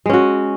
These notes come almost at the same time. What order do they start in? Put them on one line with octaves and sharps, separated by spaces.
G#3 C#4 F#4